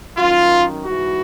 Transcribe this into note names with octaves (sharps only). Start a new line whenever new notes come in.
F#2 D#3 F4
G#2 E3 F#4